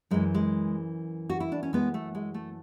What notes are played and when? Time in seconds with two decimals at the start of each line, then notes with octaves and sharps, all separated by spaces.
0.11 F#2 E3 G#3
0.35 G#3
1.30 F#4
1.40 E4
1.52 D4
1.63 C#4
1.73 G#3 B3
1.94 A3
2.15 G#3
2.34 A3